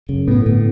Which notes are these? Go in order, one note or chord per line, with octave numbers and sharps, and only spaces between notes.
F#2 C#3
A2 B3
A2 D3